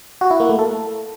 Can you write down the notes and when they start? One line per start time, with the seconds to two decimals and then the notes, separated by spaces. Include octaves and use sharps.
0.21 F#4
0.31 E4
0.40 A#3
0.49 A3
0.59 A4